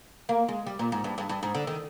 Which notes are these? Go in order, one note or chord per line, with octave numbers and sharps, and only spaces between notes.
A#3
G#3
G3
A#2
G#2
G2
G2
G2
G#2
D3
D#3